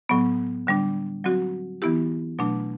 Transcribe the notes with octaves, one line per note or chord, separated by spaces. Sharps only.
A2 F#3 B3
D3 G3 D4
F#3 C4 F#4
E3 B3 E4 G4
B2 F#3 A3 D4